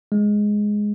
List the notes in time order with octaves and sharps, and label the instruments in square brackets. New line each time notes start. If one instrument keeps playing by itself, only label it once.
[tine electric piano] G#3